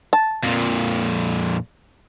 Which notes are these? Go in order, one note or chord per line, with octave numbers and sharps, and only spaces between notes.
A5
F2 A#2